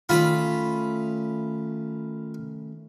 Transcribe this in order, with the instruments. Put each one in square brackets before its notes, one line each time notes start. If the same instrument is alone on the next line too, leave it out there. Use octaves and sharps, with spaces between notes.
[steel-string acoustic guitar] D#3 A3 C#4 [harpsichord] F4 B5